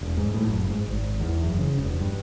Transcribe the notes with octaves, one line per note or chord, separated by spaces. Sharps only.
E1
G#2
A2
F#1
G#2
G#1
E2
F#1
C#3
E1
G2